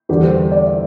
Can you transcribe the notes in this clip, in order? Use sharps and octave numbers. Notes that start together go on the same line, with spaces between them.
E2 D3 G3 G4
C5
C5
D5
E5